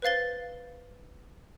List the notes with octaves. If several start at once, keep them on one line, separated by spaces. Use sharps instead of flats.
B4 C5 F5 A6 G7